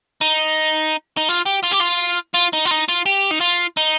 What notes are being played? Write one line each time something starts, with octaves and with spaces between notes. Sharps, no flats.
D#4
D#4
F4
G4
F4
G4
F4
F4
D#4
F4
D#4
F4
G4
D#4
F4
D#4